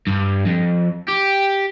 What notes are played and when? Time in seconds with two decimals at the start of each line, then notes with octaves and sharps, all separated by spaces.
0.07 G2
0.46 F2
1.08 G4